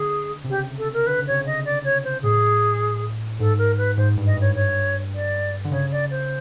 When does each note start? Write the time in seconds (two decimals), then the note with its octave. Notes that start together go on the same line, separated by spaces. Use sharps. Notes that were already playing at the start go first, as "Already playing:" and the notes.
Already playing: D3 G#4
0.44 C3
0.49 C#3 G4
0.78 A4
0.93 A#4
1.07 D3 B4
1.19 C#3
1.27 C3 C#5
1.41 C#3
1.46 D#5
1.65 D5
1.84 C#5
2.04 C5
2.23 A2 G#4
3.40 G#2 A4
3.58 A#4
3.78 B4
3.97 G#2 C5
4.17 G2
4.26 D#5
4.37 G2 C#5
4.55 C#5
5.14 D5
5.65 D3
5.71 C#3 C#5
5.92 D5
6.11 C5